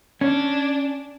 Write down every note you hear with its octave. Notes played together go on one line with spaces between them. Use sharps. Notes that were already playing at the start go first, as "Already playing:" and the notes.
C#4 D4